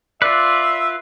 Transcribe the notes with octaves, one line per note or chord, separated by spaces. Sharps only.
F4 B4 D5 E5